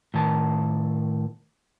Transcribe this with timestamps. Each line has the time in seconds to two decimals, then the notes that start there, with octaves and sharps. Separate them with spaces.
0.14 A2 D#3 A5